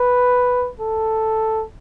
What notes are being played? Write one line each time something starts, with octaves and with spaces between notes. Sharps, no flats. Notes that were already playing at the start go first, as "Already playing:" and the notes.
Already playing: B4
A4